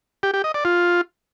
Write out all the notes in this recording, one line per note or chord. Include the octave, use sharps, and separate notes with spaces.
G4
G4
D#5
D5
F4